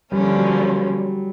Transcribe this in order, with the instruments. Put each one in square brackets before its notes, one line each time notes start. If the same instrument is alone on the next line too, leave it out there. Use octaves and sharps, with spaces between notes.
[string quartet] D3 F3 A#3 C#4 [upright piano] G3
[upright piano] F#3